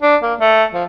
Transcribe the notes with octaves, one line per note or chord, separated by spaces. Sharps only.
D4
A#3
A3
F3